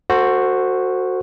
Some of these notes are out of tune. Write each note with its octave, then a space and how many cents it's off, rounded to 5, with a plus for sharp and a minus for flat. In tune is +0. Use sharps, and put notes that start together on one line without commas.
F#4 -5 A4 +40 C5 +0